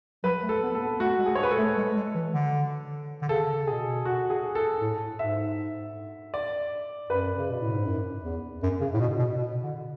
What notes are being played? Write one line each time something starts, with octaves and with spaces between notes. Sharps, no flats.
F#3 B4
A3
A4
B3
A4
B3
A3 F#4
G#3
G#4
G#3 C#5
B4
A4
A3
G#3
G#3
E3
D3
D3
C#3 A4
B2 G#4
F#4
G#4
A4
A2
G#2 E5
D5
F#2 B4
C#3
B2
A2
G#2
F#2
E2
F#2
C#3
A2
B2
B2
B2
D3